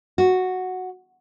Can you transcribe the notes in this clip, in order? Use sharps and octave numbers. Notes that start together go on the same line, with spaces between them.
F#4